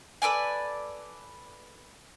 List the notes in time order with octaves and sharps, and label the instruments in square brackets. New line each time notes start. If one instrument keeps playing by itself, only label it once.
[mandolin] A4 B4 D5 G#5